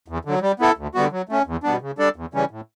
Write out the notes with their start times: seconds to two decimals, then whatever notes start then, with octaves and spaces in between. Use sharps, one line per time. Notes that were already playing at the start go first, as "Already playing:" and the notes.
0.08 E2
0.25 D3 F#3
0.42 G3
0.60 B3 E4 A4
0.77 D2
0.95 D3 G3 B3 F#4
1.12 F#3
1.29 A3 C#4
1.47 E2
1.63 B2 G3 B3 D4
1.81 C#3
1.98 G3 D4 A4 D5
2.16 E2
2.33 C#3 E3 G3 C#4
2.51 A2